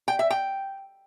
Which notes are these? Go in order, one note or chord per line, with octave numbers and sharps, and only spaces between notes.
G5
E5
G5